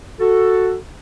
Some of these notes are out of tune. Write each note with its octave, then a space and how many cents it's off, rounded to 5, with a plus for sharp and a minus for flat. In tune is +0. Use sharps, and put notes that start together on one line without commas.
F#4 +0 A4 +10